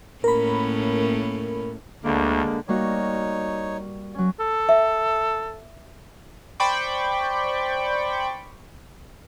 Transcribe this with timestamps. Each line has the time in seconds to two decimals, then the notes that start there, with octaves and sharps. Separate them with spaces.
0.24 A2 A#3 C#4 A#4 B5
2.04 D2 D3 G#3 A#3
2.68 G3 A#3 D#4 F#4 C#5
4.15 F#3 C#4
4.40 A4
4.69 E5
6.60 C5 D5 G5 B5 C#6 D6